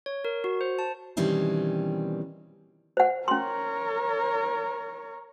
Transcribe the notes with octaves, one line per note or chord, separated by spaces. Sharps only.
C#5
A#4
F#4
C5
A5
B2 D#3 E3 G3 C4 C#4
C5 F#5
C#4 A#4 C#5 C6